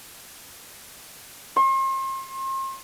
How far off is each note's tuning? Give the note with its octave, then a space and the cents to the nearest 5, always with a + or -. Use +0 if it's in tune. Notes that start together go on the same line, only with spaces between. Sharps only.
C6 +40